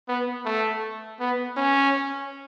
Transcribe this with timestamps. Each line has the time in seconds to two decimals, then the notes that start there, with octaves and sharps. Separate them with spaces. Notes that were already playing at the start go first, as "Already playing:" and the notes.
0.08 B3
0.45 A3
1.20 B3
1.57 C#4